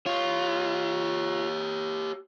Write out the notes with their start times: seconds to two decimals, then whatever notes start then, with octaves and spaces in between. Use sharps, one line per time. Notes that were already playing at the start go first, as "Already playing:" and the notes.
0.06 F4 G4 C#5